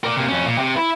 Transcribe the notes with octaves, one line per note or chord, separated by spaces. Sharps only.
A#4 D5
C3 A#3
F2 C#4
A#2
C3
E4